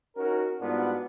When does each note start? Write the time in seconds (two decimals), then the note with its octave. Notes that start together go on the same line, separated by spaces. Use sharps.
0.16 C#4 D#4 F#4 A#4
0.60 G#2 G3 B3 D4 F4 F#4